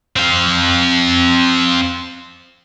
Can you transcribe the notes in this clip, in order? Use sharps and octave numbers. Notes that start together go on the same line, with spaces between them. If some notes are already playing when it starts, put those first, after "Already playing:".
C4 F5